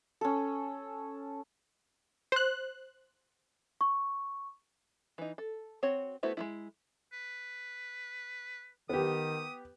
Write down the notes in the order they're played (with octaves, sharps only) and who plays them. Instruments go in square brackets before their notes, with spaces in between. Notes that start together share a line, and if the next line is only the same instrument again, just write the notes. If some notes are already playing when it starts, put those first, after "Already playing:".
[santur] C#4 A4
[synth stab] C5 F#6
[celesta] C#6
[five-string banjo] E3 D#4
A4
C4 F#4 C#5
A3 B3 E4 F#4 C5
G#3 A#3 E4
[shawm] B4
[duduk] D#3 [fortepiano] B3 G4 [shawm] D#6